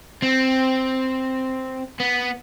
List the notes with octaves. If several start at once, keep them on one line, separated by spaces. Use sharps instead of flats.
C4
B3